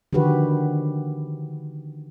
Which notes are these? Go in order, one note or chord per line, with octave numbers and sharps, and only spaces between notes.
D3 D#3 F3 F#4 G4 B4